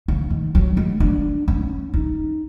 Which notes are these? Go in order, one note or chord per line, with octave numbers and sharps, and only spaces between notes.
C#3
D#3
F#3
G#3
D4
C#4
D#4